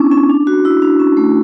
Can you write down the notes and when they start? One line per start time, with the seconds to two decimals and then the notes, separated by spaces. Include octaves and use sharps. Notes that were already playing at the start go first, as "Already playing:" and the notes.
Already playing: B3 C#4 D4 E4
0.11 C#4
0.30 D4
0.47 F#4
0.65 E4
0.82 D4
1.00 C#4
1.17 A3